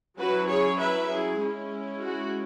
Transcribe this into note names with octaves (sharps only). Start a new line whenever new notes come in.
F#3 C#4 E4 F#4 B4
G#4 C#5
B4 E5
E4 G#4
G#3 C#4 E4
F#4